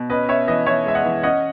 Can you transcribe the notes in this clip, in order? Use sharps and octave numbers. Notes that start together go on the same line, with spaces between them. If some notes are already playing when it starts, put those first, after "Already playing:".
Already playing: B2
C#4 B4 D#5
C#4 C#5 E5
E3 B4 D#5
E3 C#5 E5
G#3 E5
D#5 F#5
E3
C#4 D#5 F#5